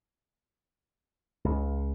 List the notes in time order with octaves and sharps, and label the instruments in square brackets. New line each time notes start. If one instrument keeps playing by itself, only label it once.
[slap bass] C#2